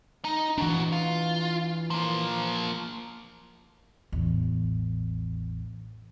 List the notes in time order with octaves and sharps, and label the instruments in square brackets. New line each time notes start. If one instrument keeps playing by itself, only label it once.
[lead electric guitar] D#4
[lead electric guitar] A#2 F#4 [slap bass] E3 D4
[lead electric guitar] F4
F3 A#3
[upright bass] A1 E2